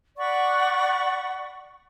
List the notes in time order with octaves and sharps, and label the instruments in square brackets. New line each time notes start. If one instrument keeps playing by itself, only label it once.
[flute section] D5 F#5 B5 C#6